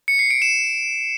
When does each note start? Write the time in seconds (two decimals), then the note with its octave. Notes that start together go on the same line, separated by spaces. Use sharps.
0.08 C#7
0.19 C7
0.31 D7
0.42 E7